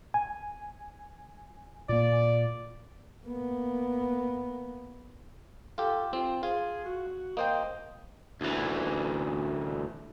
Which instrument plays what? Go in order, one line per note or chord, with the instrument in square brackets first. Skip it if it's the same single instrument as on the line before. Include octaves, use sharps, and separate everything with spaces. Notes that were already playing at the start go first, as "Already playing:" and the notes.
[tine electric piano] G#5
[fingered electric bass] A#2 A#3 [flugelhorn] D5
[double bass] A#3 B3
[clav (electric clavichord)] F4 G4 [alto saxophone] A4
[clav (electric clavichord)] C4 [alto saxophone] F4
[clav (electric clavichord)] F4 [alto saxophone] G#4
[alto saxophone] F#4
[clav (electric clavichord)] A#3 C5 G5 [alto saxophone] D#5
[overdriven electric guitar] D2 E3